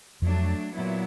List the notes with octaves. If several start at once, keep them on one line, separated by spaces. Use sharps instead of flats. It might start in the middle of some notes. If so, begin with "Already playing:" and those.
F2 F3 F#3 A3 D4
A#2 F#3 B3 E4